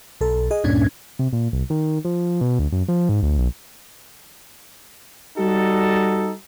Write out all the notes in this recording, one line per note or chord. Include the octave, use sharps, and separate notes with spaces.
B1 A4
G#4 D#5
D2 G2 A#2 C#4 D4 G#6
C3
A#2
C2
D#3
F3
B2
D2
F#2
F3
G#2
D2
B1
G3 D#4 F#4 A4